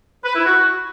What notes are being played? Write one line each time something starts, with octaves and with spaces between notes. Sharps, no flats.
B4
E4
F#4